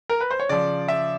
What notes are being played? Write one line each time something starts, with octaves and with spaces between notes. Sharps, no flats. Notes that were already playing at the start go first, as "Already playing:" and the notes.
A#4
B4
C5
C#5
C#3 F3 D5
E5